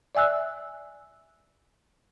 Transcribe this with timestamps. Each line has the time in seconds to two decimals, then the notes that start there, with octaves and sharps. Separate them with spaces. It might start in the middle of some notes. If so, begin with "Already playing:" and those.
0.15 D5 E5 G#5 E6 F#6